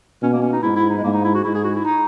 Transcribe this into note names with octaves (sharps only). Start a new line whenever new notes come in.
B2 C#4
A#3
C#4
D#4
G#2 E4
E4
D#4
G#3
G#2 A#3
D#4
E4
F#4
G#2 E4
G#4
F#4
E4
D#4